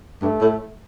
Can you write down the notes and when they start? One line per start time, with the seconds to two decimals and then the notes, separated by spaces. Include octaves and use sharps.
0.22 G2 A3
0.41 A2